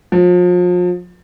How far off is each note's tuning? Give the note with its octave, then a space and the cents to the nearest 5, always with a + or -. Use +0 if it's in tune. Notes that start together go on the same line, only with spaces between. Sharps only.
F3 +35